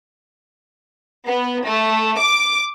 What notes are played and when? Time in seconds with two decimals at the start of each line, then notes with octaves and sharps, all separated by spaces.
1.27 B3
1.66 A3
2.19 D6